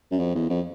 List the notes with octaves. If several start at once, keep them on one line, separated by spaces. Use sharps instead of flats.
F#2
F2
E2
F2